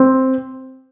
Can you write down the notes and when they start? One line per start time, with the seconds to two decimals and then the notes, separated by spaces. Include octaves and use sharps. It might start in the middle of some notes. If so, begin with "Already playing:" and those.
Already playing: C4